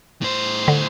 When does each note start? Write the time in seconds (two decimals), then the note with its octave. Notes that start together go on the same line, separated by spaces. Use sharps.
0.21 A2 C5
0.68 D3